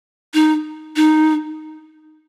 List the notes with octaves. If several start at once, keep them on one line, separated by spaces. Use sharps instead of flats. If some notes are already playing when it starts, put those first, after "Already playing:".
D#4
D#4